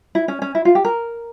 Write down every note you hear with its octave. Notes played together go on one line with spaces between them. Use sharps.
E4
C#4
C#4
E4
F4
G4
A#4